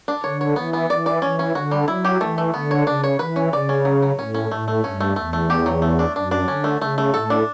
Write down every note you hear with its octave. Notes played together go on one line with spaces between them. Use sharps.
D4
D3 C#5
C#5
E3 B3
B3
E3 D5
D5
E3 C#4
C#4
D3 F#4
G3
F#3 E4
G4
E3 A3
A3
D3 B3
C#5
C#3 D4
C#5
E3 B4
C#4
C#3 D5
C#4
F#3
F#3
A2 C#4
C#4
A2 A3
A3
G2 C#4
A3
E2 A3
A3
G4
F#3
A3
D4
F#2 D4
D4
D3 C#4
A3
C#3 A3
A3
A2 A4
D4